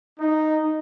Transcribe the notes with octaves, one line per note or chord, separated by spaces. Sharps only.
D#4